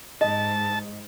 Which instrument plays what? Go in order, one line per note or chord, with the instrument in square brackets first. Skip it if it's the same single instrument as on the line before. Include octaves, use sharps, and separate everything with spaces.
[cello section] G#2 [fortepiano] D#5 [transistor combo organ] A5